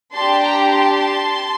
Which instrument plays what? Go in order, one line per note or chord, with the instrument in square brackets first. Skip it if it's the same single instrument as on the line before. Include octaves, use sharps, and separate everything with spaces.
[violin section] D4 G4 A5 C6
G5 A#5
A5 C6